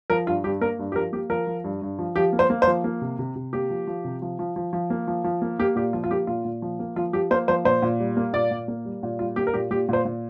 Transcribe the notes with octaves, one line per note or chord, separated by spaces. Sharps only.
F3 A#4
G2 F4
G2 G4
A#3 A#4
G2
G4
F3 A#4
A#3 G4
F3 A#4
F3
G2
G2
F3
F3 G4
A#3
C5
A#3
C5
F3
A#3
C3
C3
C3
A#3 G4
F3
F3
C3
F3
F3
F3
F3
A#3
F3
F3
A#3
A#3 G4
A#2 G4
F3 F4
F4
A#3 G4
A#2 F4
A#2
F3
A#3
F3 F4
F3 G4
A#3 C5
F3 C5
A#2 C5
A#2
G3
A#3
A#2 D5
A#2
A#3
G3
A#2
G3 F4
A#3 G4
A#4
A#2 G4
A#2 G4
A#2 C5
A#2